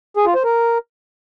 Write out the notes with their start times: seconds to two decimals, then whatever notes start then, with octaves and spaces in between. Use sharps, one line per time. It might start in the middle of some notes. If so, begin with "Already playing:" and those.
0.17 G#4
0.26 F4
0.35 C5
0.44 A#4